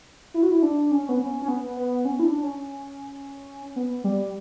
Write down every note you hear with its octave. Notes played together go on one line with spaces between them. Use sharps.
E4
F#4
E4
D4
C#4
B3
C#4
C#4
B3
B3
C#4
E4
D4
C#4
B3
G3